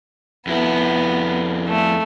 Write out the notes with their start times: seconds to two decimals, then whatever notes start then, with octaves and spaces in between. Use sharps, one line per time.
0.47 F2 B3 E4
1.68 A3